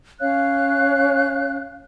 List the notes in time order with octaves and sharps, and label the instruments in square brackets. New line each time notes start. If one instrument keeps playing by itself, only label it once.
[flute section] C#4 C#5 F5 F#6